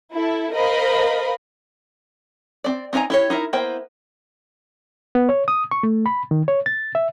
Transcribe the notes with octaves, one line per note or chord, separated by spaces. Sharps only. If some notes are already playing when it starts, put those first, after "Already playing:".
E4 A4
A#4 C5 D#5 F5 B5
C4 D5
C4 D#4 B4 G#5 A#5
E4 G4 C#5
D#4 E4 A#4
A#3 B3 E4 C5 G5
B3
C#5
D#6
C#6
A3
B5
D#3
C#5
A6
E5